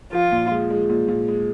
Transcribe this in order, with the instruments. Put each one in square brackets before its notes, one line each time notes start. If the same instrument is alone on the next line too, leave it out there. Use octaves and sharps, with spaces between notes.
[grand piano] F3 [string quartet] F4
[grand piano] A#2
G#3
G#3
A#2
A#2
G#3